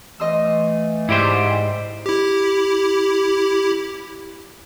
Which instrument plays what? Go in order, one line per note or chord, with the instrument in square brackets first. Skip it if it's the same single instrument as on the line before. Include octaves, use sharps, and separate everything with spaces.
[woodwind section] E3 A3 [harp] D#5 C6 E6
[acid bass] G#2 [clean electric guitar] E4 G4 C5 [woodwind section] D5 D6
[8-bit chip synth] E4 G4